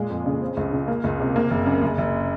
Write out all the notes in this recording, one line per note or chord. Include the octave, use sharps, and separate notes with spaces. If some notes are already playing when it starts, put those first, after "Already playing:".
Already playing: A#2 G#3
F2
C#3
C4
C#2
C#3
A#3
C#2
C3
A#3
F#1
F#2
F#1
F#1